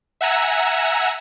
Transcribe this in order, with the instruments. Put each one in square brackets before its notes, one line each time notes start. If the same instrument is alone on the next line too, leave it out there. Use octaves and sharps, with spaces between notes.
[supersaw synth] E5 F#5 G#5 A#5 E6